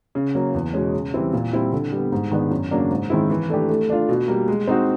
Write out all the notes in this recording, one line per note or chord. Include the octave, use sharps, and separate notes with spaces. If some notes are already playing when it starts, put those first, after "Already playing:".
C#3
F#3 A#3 C#4
E2
B2 G#3 C#4
C#3
E3 G3 C4 E4
A#2
G3 C4 E4
D3
G3 B3
G#2
D#3 G#3 B3 D4
F#2
C#3 F#3 A#3 D4
G#2
D#3 G#3 C4 E4
E3
A3 D4 G4
A3
D4 F4
B2
G3 A#3
G#3
C4 D#4 F#4